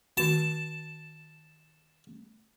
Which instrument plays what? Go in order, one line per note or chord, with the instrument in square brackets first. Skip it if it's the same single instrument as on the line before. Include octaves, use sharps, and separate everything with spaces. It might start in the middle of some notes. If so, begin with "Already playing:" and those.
[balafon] D#3 F#4 [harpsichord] A5